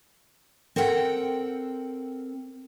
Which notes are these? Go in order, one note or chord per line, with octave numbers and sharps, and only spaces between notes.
C4 A4 A#4 F#5 G5